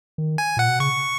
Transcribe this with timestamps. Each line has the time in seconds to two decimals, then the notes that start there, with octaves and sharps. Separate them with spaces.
0.18 D#3
0.38 G#5
0.57 A#2 F#5
0.68 B2
0.80 C#3 C#6